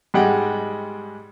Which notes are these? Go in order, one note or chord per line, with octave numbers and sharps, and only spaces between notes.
G#2 G3 G#3 D#5 F#5 G5